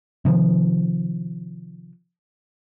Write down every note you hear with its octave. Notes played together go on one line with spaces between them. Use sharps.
C3 D#3 F3